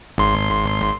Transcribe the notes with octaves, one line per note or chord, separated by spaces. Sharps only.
G#1 C6